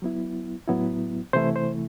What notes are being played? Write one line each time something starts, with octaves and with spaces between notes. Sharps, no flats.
F#3 B3 E4
A2 F#3 B3 E4
C3 E3 A3 E4 C5
C5